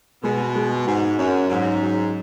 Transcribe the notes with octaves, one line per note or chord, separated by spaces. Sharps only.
B2 G#3
G#3
G#2 F#4
F#2 C#4
G#2 F#3
F#3